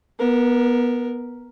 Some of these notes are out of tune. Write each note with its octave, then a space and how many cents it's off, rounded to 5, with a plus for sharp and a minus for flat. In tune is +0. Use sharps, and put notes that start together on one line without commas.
B3 -15 A#4 +5